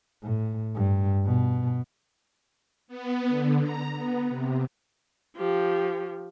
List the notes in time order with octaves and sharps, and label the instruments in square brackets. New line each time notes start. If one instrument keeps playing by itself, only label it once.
[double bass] A2
G2
B2
[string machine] B3
D3
A#5
B3
C3
[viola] F3 G4